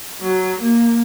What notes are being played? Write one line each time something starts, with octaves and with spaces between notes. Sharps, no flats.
F#3
A#3